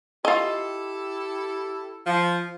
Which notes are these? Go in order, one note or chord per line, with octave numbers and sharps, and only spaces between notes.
E4 F4 G4 A4 D#5
F3